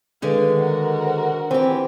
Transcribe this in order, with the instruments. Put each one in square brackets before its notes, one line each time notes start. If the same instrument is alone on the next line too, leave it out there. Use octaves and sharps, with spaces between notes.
[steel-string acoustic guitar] D3 G#3 [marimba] D#3 G#4 B4 [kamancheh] F5
[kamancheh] F#4 A#4
[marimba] C5
[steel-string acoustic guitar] E3 G4 [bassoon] C4